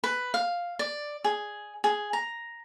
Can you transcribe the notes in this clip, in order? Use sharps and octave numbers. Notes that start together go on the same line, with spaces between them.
B4
F5
D5
G#4
G#4
A#5